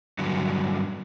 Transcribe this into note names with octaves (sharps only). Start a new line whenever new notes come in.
G2 D3 F#3